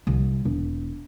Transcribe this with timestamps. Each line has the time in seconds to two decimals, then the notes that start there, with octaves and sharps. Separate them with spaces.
0.07 C2
0.45 E1